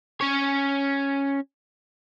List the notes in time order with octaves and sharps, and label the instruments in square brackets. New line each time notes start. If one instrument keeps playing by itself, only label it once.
[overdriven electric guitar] C#4 C#5